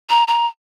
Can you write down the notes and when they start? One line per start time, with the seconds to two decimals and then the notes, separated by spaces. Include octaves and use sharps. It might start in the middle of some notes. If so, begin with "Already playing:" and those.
0.10 A#5
0.28 A#5